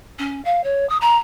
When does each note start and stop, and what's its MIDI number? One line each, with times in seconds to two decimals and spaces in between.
0.19 0.43 61
0.45 0.64 77
0.64 0.88 73
0.89 0.97 87
1.01 1.17 82